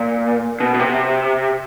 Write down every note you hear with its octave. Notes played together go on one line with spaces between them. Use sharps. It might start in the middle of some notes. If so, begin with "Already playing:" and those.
Already playing: A#2
B2
B2
C3